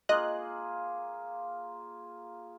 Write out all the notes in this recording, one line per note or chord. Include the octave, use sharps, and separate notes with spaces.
A#3 F4 G#4 D#5 F#6